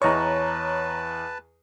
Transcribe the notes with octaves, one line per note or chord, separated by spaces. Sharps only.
E2 B4 C#5 D#5 A5 A#5 C#6